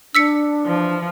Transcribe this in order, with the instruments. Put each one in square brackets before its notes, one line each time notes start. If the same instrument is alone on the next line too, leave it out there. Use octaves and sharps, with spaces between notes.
[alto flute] D4 [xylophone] E6 B6 C#7
[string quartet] E3 F3